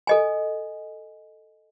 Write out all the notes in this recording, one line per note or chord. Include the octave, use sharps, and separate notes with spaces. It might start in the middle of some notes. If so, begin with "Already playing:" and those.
A4 D#5 G#5